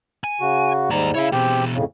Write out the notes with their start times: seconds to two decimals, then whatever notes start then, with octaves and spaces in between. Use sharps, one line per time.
0.24 G#5
0.40 C#3 F#4
0.90 D#2 G#2 G3 A#5
1.14 C#3 E4 C#5 F5
1.32 B2 C4 G4 G#4 G5
1.73 F2 A2 C#3